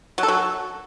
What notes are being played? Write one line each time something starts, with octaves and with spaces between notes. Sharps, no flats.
F#3
A4
F#3